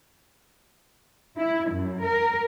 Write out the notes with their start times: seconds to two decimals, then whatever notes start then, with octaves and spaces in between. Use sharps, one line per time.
1.39 E4
1.72 F#2
2.05 A#4